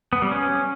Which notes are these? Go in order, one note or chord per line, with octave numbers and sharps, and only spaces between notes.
B3
G3
C#4